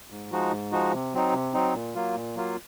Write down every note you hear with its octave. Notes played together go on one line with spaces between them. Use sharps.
G#2
F3 G#3 D#4 F#4
G#2
F3 G#3 D#4 F#4
C3
F#3 C4 D#4
C3
F#3 C4 D#4
A#2
F#3 A#3 F4
A#2
F#3 A#3 F4